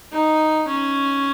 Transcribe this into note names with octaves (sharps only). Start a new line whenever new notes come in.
D#4
C#4